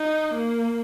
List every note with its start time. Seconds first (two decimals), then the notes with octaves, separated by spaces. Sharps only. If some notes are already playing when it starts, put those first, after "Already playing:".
Already playing: D#4
0.35 A#3